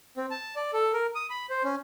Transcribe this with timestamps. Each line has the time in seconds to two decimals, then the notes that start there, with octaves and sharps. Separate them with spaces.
0.17 C4
0.31 A5
0.56 D5
0.73 A4
0.93 A#4
1.15 D#6
1.30 B5
1.50 C5
1.64 C#4